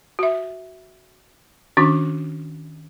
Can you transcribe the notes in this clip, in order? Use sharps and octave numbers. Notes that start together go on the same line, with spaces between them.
F#4 E5
D#3 C#4 D4 F#4 C#6 D6